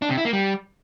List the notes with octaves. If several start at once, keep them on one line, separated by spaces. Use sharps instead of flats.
D4
C3
E4
A#3
G3